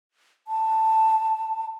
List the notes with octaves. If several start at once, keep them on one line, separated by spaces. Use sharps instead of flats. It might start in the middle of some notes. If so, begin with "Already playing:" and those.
A5